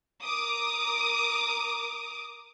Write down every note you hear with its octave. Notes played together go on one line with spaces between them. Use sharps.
A#4 D6 D#6